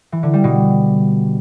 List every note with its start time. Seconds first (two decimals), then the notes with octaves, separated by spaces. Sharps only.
0.12 E3
0.23 D3
0.33 G3
0.44 B2